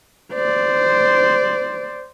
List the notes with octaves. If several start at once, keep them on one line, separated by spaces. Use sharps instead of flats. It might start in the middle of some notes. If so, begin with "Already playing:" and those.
C5 D5